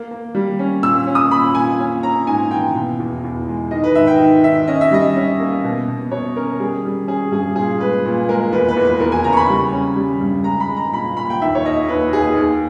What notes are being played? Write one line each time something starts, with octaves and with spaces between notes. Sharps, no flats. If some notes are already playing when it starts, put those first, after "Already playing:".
Already playing: A#3
A#3
G3
C#4
A#2 E6
C#4
D#6
A#2 B5
A#2 G#5
C#4
C#4 A#5
G#2 G#5
E3 G5
B2
E2
E2
G#3
D#3 D#5
B4
G#2 E5
G5
D#3
D#3 E5
C#4 D#5
E5
G3 D#5
C#4
A#3
B2
B2
B2 C#5
C#4 A#4
G3 G#4
G3
C#4 G#4
G2 G#4
A#2 G#4
G#3 B4
A#2
G#3 A#4
E2 B4
B4
E2
B4
E2 A#4
G#5
C#3 A#5
C#6
B5
G3
C#4
G3
G2
G#3 A#5
B5
G#3
A#5
A#2 B5
A#2 B5
G5
D#2 E5
C#5
D#2 D#5
D#2 B4
D#2 G#4
D#2